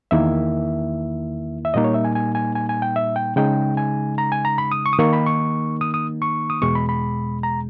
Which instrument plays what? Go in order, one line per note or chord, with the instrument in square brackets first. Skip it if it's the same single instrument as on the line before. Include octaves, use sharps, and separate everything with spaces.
[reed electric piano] E2 D#3 A#3 E4 E5
E5
A#2 G3 A#3 D#4 D#5
C#5
E5
G#5
G#5
G#5
G#5
G#5
G5
E5
G5
C#3 G#3 D#4 G5
G#5
A#5
G#5
A#5
B5
D#6
C#6
D#6
D#3 A#3 D#4 C#6
B5
C#6
D#6
D#6
C#6
D#6
E2 B2 G#3 C#6
B5
B5
A#5